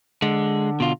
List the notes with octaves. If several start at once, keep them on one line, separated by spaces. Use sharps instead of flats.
D3 G#3
B2 F4